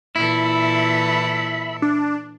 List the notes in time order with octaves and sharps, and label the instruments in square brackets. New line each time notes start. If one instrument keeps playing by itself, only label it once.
[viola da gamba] A#2 E3 A4 [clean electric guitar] E4 [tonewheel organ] E5 B5
[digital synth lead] D4